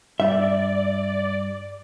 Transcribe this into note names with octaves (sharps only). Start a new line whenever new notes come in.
G2 G3 D5 E5